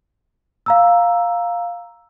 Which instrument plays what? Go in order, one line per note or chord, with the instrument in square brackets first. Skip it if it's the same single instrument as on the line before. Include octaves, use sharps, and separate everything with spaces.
[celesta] F5 A#5 E6